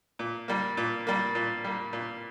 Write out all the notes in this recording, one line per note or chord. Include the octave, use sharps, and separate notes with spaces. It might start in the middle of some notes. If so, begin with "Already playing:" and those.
A#2
G3 A#3
A#2
G3 A#3
A#2
G3 A#3
A#2